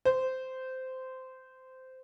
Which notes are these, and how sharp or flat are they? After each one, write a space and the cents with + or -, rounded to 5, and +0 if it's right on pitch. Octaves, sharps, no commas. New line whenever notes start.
C5 -15